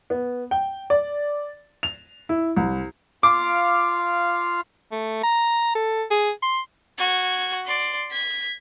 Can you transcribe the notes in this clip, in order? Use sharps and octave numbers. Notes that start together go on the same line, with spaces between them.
B3
G5
D5
F7
E4
C2
F4 F5 D6
A3
A#5
A4
G#4
C6
F#4 G#6
D5 C6
G#6 B6